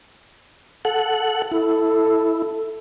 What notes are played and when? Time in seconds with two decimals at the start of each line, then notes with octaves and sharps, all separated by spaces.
0.85 A4 F#5
1.51 E4 A4